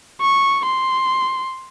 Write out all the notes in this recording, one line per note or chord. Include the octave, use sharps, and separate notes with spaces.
C#6
C6